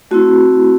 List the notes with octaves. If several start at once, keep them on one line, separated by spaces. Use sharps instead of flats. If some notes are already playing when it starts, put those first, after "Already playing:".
A3 C4 E4 F#4